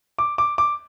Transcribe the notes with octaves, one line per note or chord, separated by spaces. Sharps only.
D6
D6
D6